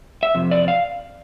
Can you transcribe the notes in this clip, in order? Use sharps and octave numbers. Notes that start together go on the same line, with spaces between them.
E5
F2 C3
D5
F5